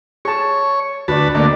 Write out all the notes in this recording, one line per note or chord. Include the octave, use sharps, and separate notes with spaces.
G#4 C#5 A5
D2 F#4 B4 D5 A5
D3 A3 A#3 D5 D#5